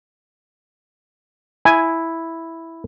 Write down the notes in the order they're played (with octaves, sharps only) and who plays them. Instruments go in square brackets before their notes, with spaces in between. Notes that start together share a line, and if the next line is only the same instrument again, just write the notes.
[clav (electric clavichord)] E4 [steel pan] G#5